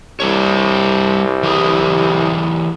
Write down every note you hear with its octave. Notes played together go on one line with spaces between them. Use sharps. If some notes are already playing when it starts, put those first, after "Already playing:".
C2 G3 D4 C#5
E3 G4 G#4